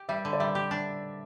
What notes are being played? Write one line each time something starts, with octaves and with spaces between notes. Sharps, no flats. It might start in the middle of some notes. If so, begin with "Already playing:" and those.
Already playing: G4
G3 E5
D3
D5
G3 E5
G4
D4